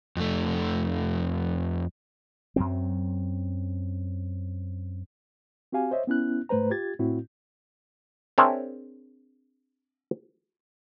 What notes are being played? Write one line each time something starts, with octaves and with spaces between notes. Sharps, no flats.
F2 A3
F#2 F#3 C4
C4 F#4 G4 F5 G#5
C5 C#5 D#5 E5
B3 C#4 E4 F#6
G#2 A3 B4 C5 A#5
F4 G4 G#6 A6
A2 C4 E4 F#4
C4 D4 G#4 A#4 C#5 E5